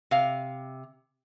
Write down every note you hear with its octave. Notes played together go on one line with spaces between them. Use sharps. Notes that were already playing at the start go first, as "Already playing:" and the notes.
C3 F5